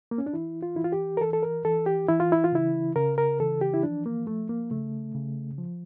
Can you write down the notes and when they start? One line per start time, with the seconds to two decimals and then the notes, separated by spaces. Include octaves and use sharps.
0.11 A#3
0.18 C#4
0.26 D4
0.33 E3 E4
0.63 F4
0.76 E3 E4
0.84 F4
0.92 G4
1.17 A#4
1.21 E3 A4
1.33 A4
1.43 A#4
1.65 E3 A4
1.86 G4
2.08 E3 E4
2.20 F4
2.32 E4
2.44 F4
2.52 C#3 E4
2.96 C#3 A#4
3.18 A#4
3.40 E3 A4
3.61 G4
3.74 E4
3.83 F3 D4
4.06 A#3
4.27 F3 A3
4.49 A#3
4.71 C#3 A3
5.15 C#3
5.58 F3